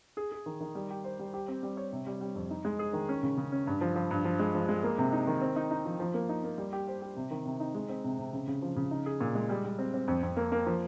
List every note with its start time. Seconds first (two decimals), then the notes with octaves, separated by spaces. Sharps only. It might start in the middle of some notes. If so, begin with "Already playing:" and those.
0.17 G#4
0.32 G#4
0.46 D#3
0.60 D#3
0.75 G3
0.90 G4
1.04 C5
1.19 G3
1.34 G4
1.48 C4
1.63 G3
1.77 C#5
1.92 C3
2.07 G3
2.21 G3
2.35 F2
2.50 D#4
2.65 G#3
2.79 G#4
2.93 D#3
3.09 C#4
3.23 C#3
3.37 C#3
3.52 C#4
3.67 G2
3.81 F3
3.96 F3
4.11 G2
4.25 F3
4.39 G#3
4.55 F3
4.69 G#3
4.83 A#3
4.98 C3
5.12 D#4
5.27 D#3
5.41 C4
5.56 D#4
5.71 D#4
5.85 F3
6.00 F3
6.14 A#3
6.29 D#4
6.43 A#3
6.58 G3
6.73 G4
6.88 C5
7.02 G4
7.16 C3
7.31 D#3
7.45 C3
7.60 D#4
7.75 G#3
7.89 C4
8.04 C3
8.19 C3
8.33 C#3
8.48 C#3
8.62 F3
8.76 C#3
8.91 D#4
9.06 G#4
9.20 A#2
9.35 G#3
9.49 G3
9.65 G3
9.79 C4
9.94 C4
10.08 F2
10.23 F2
10.37 A#3
10.52 A#3
10.67 F3